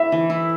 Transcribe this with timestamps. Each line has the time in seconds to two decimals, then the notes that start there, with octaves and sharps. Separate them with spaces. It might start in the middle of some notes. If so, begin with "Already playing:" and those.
Already playing: E4 E5
0.12 E3
0.30 E4